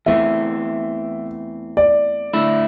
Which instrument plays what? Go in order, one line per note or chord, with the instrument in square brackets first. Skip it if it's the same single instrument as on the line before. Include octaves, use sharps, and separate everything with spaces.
[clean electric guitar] E2 E3 A3 C4 [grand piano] E5
[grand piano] D5
[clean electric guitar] D3 A3 E4